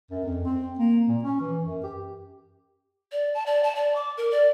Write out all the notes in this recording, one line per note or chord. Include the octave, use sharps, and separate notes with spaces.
F#2
F2
C4
A#3
A#2
C#4
E3
F#2
G4
D5
A5
D5
A5
D5
D6
A#4
D5